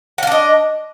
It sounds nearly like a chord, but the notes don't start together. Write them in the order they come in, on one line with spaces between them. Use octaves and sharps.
F#5 F5 D4 D#5